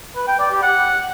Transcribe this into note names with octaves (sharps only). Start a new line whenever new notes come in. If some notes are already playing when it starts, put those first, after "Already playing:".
B4
G5
D5
G4
F#5